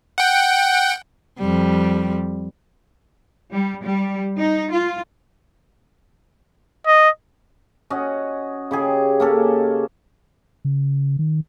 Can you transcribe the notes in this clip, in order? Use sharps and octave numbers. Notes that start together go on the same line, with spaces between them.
F#5 G5
F2 G3
G3
G3
D#4
F4
D#5
C#4 F#4 D#5
C#3 G4 G#4
A#3 C#4 A4
C#3
D#3